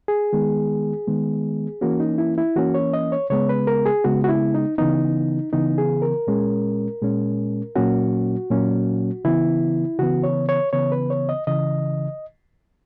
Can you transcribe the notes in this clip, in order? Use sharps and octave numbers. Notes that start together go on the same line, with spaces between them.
G#4
D#3 G#3 B3
D#3 G#3 B3
E3 A#3 C#4 F#4
D#4
E4
E4
E3 A#3 C#4 F#4
C#5
D#5
C#5
C#3 G#3 B3 C#5
B4
A#4
G#4
C#3 G#3 B3 F#4
F#4
E4
D#4
C#3 E3 B3 D#4
C#3 E3 B3 D#4
G#4
A#4
A#2 G#3 C#4
A#2 G#3 C#4
A#2 F#3 A#3 C#4 F#4
A#2 F#3 A#3 C#4
C#3 E3 B3 E4
C#3 E3 B3 F#4
C#5
C#5
C#3 E3 B3 C#5
B4
C#5
D#5
C#3 E3 D#5